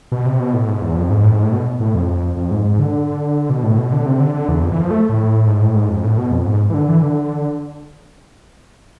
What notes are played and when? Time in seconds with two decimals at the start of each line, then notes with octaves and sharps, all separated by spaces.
0.12 B2
0.26 C3
0.40 B2
0.54 A2
0.68 G#2
0.82 E2
0.96 F2
1.10 G#2
1.24 A2
1.34 G#2
1.43 A2
1.53 B2
1.80 A2
1.95 F2
2.37 F2
2.51 G#2
2.65 G#2
2.79 D3
3.50 B2
3.64 A2
3.78 B2
3.92 D3
4.06 C3
4.20 D3
4.34 D3
4.49 E2
4.63 F2
4.72 E3
4.81 F3
4.91 A3
5.09 A2
5.47 G#2
5.61 A2
5.76 G#2
5.89 F2
6.04 A2
6.18 B2
6.32 F2
6.46 G#2
6.70 E3
6.74 D3
6.88 E3
7.02 D3